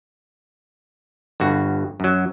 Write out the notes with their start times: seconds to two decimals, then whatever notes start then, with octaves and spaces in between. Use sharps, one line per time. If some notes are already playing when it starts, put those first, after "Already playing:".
1.40 G1 G2 F#4
2.00 F#2 F#3